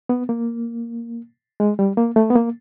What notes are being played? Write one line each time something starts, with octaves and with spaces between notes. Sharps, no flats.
B3
A#3
G#3
G3
A#3
A3
B3
A#3